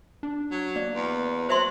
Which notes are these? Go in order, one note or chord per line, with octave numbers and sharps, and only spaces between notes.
D4
F#3
A#3 D5
E2
F#3 C5 E5 C6